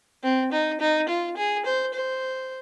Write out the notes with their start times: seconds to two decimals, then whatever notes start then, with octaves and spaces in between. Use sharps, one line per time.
0.23 C4
0.52 D#4
0.80 D#4
1.09 F4
1.37 G#4
1.65 C5
1.94 C5